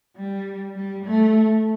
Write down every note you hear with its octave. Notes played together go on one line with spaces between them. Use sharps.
G3
G3
A3